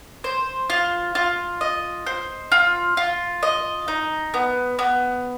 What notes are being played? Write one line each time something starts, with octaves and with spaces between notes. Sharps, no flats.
C5
F4
F4
D#5
C5
F4
F4
D#5
D#4
B3
B3